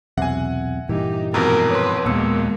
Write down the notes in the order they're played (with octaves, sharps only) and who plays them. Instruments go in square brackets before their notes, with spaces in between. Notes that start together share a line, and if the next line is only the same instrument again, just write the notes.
[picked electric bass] B1 E2 C3 [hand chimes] E5 [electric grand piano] F#5 G#5
[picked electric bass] G2 A#2 E3 [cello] D#4 G4
[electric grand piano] F2 G#2 B2 [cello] A#4 [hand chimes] A#5
[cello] B4 [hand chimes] C#5 C6
[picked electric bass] D#2 A#2 [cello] G#3 A#3 [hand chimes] B3 E6 C#7